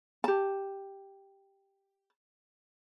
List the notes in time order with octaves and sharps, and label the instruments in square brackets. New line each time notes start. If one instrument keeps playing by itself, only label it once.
[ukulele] G4 A5